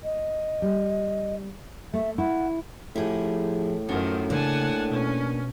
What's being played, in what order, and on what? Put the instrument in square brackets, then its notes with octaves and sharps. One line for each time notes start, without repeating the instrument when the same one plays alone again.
[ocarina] D#5
[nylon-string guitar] G3
[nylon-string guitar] A3 [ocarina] E5
[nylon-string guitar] E4 [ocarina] F#5
[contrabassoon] A2 [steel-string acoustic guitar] F3 G#4 [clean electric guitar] E4 G4
[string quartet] F#2 D#3 F3 [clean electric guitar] C#4 F#5 [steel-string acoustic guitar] F#4
[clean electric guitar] C#3 [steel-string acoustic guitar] A#3 D4 [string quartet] F#5 G#5 A5
[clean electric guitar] B2 [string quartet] C#4